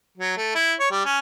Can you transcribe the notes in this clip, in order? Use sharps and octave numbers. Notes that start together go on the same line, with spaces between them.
F#3
A3
E4
C#5
G3
C#4